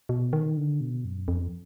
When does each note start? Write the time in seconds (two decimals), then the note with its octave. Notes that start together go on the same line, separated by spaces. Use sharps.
0.09 B2
0.33 D#3
0.57 D3
0.81 B2
1.05 F#2
1.28 F2